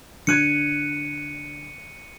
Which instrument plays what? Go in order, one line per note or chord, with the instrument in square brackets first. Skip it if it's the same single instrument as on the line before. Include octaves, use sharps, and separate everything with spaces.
[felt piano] D3 F#6 G#6 [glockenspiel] C#7 D#7